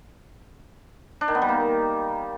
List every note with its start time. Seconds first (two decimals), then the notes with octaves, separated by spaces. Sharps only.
1.21 D4
1.28 D#3
1.35 B3
1.42 G3
1.49 A#3